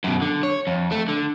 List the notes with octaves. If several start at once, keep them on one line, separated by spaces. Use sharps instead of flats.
F#2 B2
D3
C#5
F2
A3
D3